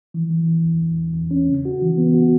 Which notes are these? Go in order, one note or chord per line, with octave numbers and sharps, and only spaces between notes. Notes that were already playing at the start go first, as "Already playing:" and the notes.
E3
E3
E3
E2
E2
E2
E2
C#4
C#3
F#4
E3
B3
F#4